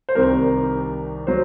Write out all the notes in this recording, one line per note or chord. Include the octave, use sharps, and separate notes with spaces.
C5
C2 C3 D#3 A#4
F#3 C5